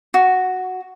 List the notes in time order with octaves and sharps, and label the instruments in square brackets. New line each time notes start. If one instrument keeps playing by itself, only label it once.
[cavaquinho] F#4